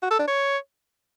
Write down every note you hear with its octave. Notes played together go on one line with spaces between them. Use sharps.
F#4
A4
D4
C#5